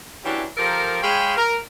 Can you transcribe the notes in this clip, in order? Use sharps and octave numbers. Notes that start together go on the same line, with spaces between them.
E3 F#3 C#4 D4 E4 G4
F3 G4 A4 A#4
G#3 G#4 C#5 F5 G5 B5
A#4